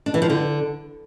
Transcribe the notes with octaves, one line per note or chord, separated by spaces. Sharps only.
D4
E3
F3
D3